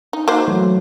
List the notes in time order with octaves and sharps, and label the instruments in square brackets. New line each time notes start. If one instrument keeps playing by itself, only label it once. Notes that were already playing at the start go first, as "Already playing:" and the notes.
[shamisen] D#4
[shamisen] A#3 F#4 C5 [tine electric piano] D#4
[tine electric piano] E3 F#3 A3